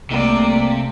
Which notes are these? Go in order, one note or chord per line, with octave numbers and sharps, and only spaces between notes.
C2 C3 A3 A#3 D5